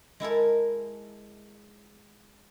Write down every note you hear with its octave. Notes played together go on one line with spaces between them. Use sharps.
G#3 E4 A4 A#4